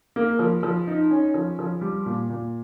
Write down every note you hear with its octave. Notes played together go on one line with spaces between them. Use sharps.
A#3
F3
F3
D#4
C#4
F3
F3
G3
A#2
A#2